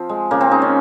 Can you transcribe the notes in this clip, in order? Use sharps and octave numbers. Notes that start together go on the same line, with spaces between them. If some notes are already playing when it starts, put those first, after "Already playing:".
Already playing: F3 C4 F4
G#3
C#3 A#3
C4
G#3 D#4
C#4